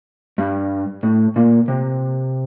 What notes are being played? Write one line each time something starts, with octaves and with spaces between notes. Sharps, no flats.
G2
A2
A#2
C3